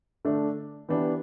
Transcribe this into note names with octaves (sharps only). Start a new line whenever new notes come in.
D3 A3 D4
E3 B3 D4 G4